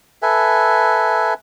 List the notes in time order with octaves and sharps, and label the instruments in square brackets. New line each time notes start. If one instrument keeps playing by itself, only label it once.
[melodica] A4 B4 E5 G#5